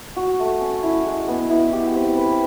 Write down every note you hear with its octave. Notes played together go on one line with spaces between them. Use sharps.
F#4
A3
C#4
E4
G#3
B3
E4
G4
C4
B4